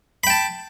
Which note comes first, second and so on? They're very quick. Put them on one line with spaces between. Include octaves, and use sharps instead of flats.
B5 G5 A5